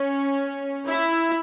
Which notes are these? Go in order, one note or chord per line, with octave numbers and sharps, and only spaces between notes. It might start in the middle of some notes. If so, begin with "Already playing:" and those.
Already playing: C#4
E4